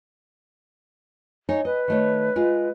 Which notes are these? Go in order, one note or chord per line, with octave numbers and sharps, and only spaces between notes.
D#4 C#5 G#5
B4 D#5
D#3 A3 C#5
G#3 F4